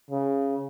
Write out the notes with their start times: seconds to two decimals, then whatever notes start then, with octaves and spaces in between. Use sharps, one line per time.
0.11 C#3